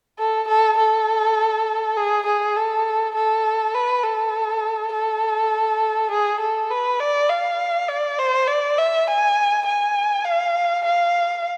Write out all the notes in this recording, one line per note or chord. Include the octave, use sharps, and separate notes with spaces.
A4
A4
A4
G#4
G#4
A4
A4
B4
A4
A4
G#4
A4
B4
D5
F5
D5
C5
D5
E5
G#5
G#5
F5
F5